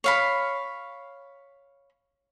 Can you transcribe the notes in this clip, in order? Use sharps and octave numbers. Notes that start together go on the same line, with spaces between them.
C#5 F5 B5